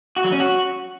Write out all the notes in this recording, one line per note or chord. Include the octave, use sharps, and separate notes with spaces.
F#4
F#3
C#4
F#4